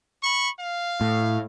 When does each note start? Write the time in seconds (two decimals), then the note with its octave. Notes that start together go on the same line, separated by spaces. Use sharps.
0.23 B5 C#6
0.59 F5
1.01 A2